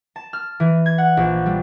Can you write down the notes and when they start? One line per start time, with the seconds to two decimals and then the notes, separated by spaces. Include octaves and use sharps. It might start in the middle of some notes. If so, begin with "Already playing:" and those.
0.16 A5
0.33 F6
0.60 E3
0.86 G#6
0.98 F#5
1.17 A#1
1.46 G3